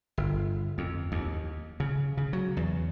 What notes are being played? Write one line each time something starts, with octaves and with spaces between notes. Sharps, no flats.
G1
F2
D#2
C#3
C#3
F#3
E2